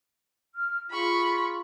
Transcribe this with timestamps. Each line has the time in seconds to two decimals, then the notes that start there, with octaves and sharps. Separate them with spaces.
0.55 F6
0.90 F4 G#4 B5 C#6